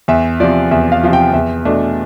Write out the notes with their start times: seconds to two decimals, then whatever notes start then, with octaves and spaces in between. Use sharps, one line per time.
0.08 E2 E5
0.40 C3 F3 D5
0.71 E2 E5
0.92 F5
1.03 C3 F3 F5
1.13 G5
1.34 E2 E5
1.65 B2 A3 D4